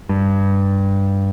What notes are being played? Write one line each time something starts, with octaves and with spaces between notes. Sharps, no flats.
G2